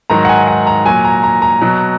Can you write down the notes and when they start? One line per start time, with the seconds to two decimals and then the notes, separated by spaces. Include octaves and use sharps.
0.10 G#2 D#3 F#3 A#5
0.25 F#5
0.29 G#5
0.47 F#5
0.67 A#5
0.86 A#2 F#3 G#5
1.05 A#5
1.23 A#5
1.42 A#5
1.61 B2 F#3